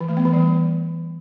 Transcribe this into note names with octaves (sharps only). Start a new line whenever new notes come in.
E3
A3
B3
E3
G3